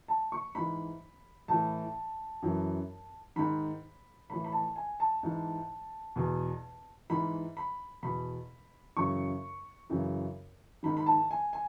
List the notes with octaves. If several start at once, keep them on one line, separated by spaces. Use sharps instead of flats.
A5
C#6
G#2 E3 B5
A2 E3 A5
F#2 E3
G#2 D#3 B5
A2 E3 B5
B5
A5
G#5
A5
G#2 E3
E2 B2
G#2 E3 B5
B5
E2 B2 B5
F#2 C#3 E3 C#6
F#2 C#3 E3
G#2 D#3 B5
B5
A5
G#5
G#5